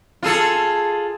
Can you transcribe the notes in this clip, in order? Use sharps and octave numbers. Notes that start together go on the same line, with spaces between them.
F4 G#4 A4